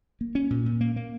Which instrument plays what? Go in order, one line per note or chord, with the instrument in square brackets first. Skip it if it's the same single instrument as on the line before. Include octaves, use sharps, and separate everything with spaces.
[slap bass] A#3
C#4
A#2
A#2
A#3
A#3